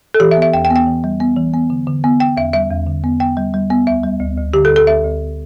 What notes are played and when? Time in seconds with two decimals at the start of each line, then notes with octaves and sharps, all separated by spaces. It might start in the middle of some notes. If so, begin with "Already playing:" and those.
0.14 A4
0.20 E3 G4
0.31 E5
0.37 B3
0.42 E5
0.53 E2 G5
0.65 G5
0.70 B3
0.76 G5
0.87 E3
1.04 G3
1.20 B3
1.37 E3
1.54 B3
1.70 D3
1.87 D3
2.04 B3
2.20 B3 G5
2.37 E2 E5
2.53 G3 E5
2.70 E2
2.87 D3
3.04 B3
3.20 B3 G5
3.37 G3
3.54 G3
3.71 B3
3.87 D2 E5
4.04 G3
4.20 D2
4.37 D2
4.54 D3 G4
4.65 A4
4.71 D2
4.76 A4
4.87 D2 E5
5.04 D2